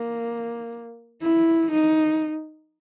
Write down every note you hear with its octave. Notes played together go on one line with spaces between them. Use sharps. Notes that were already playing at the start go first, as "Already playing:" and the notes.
Already playing: A#3
E4
D#4